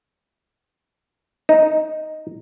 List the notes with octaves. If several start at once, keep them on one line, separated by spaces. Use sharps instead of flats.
D#4